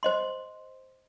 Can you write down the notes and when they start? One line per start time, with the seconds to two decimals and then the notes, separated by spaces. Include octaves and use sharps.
0.03 C5 D#5 C6